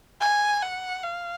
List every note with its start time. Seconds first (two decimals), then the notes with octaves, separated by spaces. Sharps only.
0.21 G#5
0.62 F#5
1.03 F5